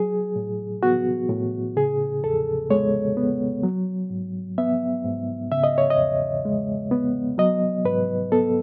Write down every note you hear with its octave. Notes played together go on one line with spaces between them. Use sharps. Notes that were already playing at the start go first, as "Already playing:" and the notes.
Already playing: F#3 G#4
A2
B3 F#4
A2
C#3 G#4
E2 A4
G#3 C#5
B3
F#3
G#2
B3 E5
G#2
C#3 E5
D#5
C#5
D#5
E2
G#3
B3
F#3 D#5
G#2 B4
B3 A4